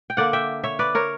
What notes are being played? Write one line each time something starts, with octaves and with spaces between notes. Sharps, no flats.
G5
D3 A#3 D5 F#5
E5 G5
C#5 E5
B4 D5
A#4 C#5